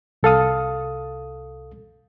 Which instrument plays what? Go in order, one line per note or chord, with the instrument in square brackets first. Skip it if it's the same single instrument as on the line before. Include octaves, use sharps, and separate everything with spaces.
[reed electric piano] C2 A4 F5 D#6